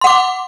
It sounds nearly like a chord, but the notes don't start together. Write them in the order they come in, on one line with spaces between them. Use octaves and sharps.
C6 F#5 D6